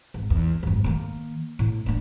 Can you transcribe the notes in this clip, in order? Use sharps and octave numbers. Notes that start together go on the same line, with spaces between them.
G#1
E2
G#1 F#2
D#3 A#3
A2
A#3 D4